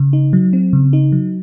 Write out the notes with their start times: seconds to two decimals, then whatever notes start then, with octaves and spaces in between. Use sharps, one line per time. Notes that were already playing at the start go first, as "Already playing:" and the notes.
Already playing: C#3
0.13 D#4
0.33 F#3
0.53 C4
0.73 C#3
0.93 D#4
1.12 F#3